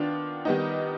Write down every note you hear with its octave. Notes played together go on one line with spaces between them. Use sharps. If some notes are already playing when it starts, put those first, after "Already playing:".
Already playing: D#3 B3 D4 F4
D#3 G3 B3 D#4